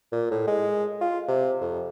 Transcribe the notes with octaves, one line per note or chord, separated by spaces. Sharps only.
A#2
A2
G#3
F4
C3
F2